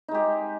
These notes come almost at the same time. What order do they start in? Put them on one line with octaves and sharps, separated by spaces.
D#4 G#3 G4